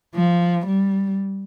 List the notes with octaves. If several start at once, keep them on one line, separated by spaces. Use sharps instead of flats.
F3
G3